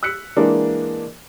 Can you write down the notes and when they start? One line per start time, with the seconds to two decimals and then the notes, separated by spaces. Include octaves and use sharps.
0.03 E6 F#6 B6 C#7
0.37 E3 G#3 A#3 D4